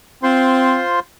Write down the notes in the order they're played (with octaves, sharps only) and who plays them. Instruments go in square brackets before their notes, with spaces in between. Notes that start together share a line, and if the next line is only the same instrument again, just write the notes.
[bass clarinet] C4 [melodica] F4 C5 C6